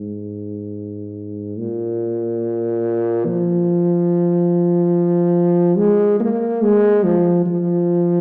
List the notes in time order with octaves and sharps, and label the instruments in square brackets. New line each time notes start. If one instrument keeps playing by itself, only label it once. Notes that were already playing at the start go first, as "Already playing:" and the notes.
Already playing: [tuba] G#2
A#2
F3
G#3
A#3
G#3
F3
F3